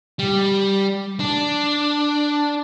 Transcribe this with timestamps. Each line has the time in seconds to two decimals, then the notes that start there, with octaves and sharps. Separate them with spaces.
0.19 G3
1.20 D4